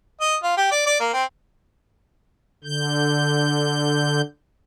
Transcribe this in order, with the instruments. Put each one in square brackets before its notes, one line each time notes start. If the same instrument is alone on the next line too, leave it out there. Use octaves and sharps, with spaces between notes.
[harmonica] D#5
F4
G4
D5
D5
A#3
C4
[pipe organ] D3 G6